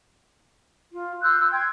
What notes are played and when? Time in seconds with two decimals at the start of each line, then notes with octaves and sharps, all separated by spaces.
0.91 F4
1.22 C6 E6 F#6 G6
1.38 E6
1.52 G5 C6 G#6